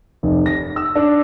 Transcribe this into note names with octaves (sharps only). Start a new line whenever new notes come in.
F1
A#6
E6
D4